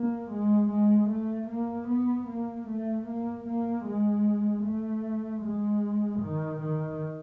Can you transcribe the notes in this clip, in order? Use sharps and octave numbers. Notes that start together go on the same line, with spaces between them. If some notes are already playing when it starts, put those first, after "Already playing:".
Already playing: A#3
G#3
G#3
A3
A#3
B3
A#3
A3
A#3
A#3
G#3
A3
G#3
D#3
D#3